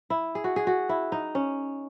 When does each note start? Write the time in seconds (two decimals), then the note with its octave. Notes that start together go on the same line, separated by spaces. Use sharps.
0.10 E4
0.35 G#4
0.44 F#4
0.56 G#4
0.67 F#4
0.89 E4
1.12 D#4
1.35 C#4